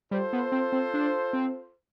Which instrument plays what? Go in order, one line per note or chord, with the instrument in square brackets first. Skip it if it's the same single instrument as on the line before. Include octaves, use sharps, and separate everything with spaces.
[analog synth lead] G3 [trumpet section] F4 A4 C5
[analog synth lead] B3
C4
C4
D4
C4